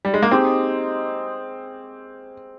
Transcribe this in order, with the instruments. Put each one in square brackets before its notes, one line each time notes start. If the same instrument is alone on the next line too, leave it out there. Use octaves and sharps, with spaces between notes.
[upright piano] G3
G#3
A#3
[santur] G#3 D#4 G4 [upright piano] C4